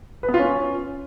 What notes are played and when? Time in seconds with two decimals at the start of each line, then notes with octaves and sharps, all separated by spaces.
0.23 B4
0.29 B3
0.34 F4
0.39 C#4